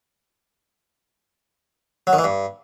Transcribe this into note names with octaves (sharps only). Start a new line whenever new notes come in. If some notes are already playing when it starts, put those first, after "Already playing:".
F#3
D#3
E3
G2